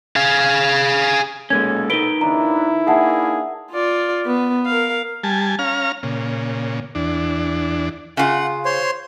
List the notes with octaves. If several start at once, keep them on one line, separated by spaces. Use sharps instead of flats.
G#4 F5
B1 A#2 G#3 A#3 C#4 A4 G#6
D#4 A#4 B4 D7 G7
D#2 C#3 D4 E4 A#5
A#3 D4 G#4 E5 F#5 A5
F4 D5
B3
A#4 F5
G3 G#5 A5
C#4 F5 A#5 F6
A#2 C#3
E2 D4
C#3 F4 F#5
C5 C#5 C6